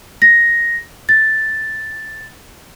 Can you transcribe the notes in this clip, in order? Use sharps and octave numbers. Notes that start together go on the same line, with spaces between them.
A#6
A6